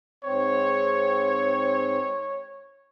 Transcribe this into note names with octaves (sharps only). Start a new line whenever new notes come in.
G#2 C4 C#5